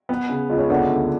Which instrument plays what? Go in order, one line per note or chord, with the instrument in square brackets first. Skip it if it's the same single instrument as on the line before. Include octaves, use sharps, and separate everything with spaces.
[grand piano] B3
C#3
C#2
[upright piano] C#4
[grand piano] D2 [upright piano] B3 D4
[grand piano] D3